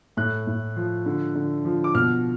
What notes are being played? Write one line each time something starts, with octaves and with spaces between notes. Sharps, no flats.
A2 F#6
A2
F3
D3
D3
F3
D6
B2 F6